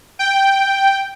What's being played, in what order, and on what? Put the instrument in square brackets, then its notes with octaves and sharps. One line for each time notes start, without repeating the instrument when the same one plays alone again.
[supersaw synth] G5